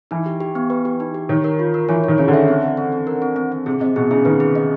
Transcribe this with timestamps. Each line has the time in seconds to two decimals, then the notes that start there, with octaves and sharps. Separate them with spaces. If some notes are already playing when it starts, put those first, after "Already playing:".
0.11 E3 D#4
0.26 G4
0.40 G4
0.55 B3
0.70 B4
0.85 G4
1.00 D#4
1.14 G4
1.29 D#3 C#5
1.44 A#4
1.59 F4
1.74 A#4
1.89 E3 C#5
2.04 D#3 C#5
2.18 C#3 C#5
2.28 D3
2.33 E5
2.48 C4
2.62 C4
2.77 C4
2.92 C4
3.07 A#4
3.22 C4
3.36 C4
3.52 C4
3.66 C3 G#4
3.80 C3 D#5
3.96 B2 G#4
4.11 C#3 G#4
4.25 D#3 B4
4.40 G#4
4.55 D#5